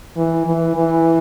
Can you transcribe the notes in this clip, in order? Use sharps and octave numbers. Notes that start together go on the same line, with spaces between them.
E3
E3
E3